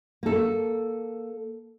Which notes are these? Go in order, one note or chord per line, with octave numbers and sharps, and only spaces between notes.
A#3 A4